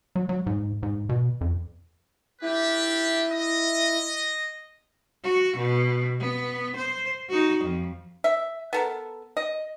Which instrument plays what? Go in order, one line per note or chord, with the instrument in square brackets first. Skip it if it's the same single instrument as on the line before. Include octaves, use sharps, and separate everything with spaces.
[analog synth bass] F#3
F#3
G#2
G#2
B2
F2
[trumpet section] D4 G4 B4 [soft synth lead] E4
[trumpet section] D#5
[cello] F#4
B2
B3
C5
D#4 F#4
F2
[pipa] E5
B3 A4 A#4
D#5